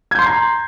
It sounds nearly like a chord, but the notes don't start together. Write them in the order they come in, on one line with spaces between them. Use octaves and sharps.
G#6 G6 C6 C7 A#5